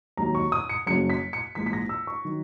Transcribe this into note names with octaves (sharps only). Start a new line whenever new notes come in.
E1 D#2 D#3 F#3 A#5
C#6
D#6
C#7
F#1 F#2 C#3 F#3 C#7
B6
C#7
A#1 G#2 E3 B6
B6
A#6
E6
C#6
D#3 F#3